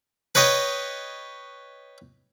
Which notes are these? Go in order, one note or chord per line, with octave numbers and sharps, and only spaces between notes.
B4 C#5 D#5 G5